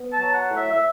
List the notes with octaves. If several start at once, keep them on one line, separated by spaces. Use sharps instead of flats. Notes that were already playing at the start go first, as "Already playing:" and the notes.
Already playing: B3
A5
F#3
F#5
A2
E5
E5